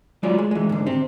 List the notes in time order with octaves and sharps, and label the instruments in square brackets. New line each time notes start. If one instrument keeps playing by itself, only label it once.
[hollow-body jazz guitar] F#3 G#3 F4 C#5 D5
G#3
E3 G#3
G#2 D3
C4 G4